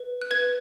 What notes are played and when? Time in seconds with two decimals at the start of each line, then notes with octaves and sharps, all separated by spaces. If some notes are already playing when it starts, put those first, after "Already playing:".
Already playing: B4
0.21 F#6
0.31 B4 G#6